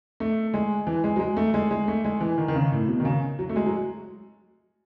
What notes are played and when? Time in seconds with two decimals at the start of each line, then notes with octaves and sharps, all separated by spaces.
0.20 A3
0.54 G#3
0.87 E3
1.04 G#3
1.16 F#3
1.20 G#3
1.37 A3
1.54 G#3
1.71 G#3
1.88 A3
2.05 G#3
2.20 E3
2.38 D#3
2.48 D#3
2.55 C#3
2.72 A2
2.88 B2
3.00 D#3
3.05 C#3
3.39 F#3
3.49 A3
3.56 G#3
3.66 F#3